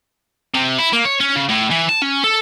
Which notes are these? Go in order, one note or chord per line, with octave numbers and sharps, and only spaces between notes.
C3
E4
A#3
C#5
C#4
C#3
A2
E3
A5
C#4
A4